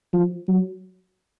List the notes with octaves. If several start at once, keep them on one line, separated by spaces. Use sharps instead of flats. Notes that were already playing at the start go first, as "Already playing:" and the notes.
F3
F#3